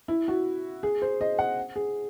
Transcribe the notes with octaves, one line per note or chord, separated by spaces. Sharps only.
E4
F#4
G#4
C5
D#5
F#5
G#4